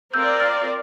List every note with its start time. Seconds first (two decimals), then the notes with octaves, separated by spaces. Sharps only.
0.14 C4 F4 A#4 D5 E6 G6
0.40 F6 A6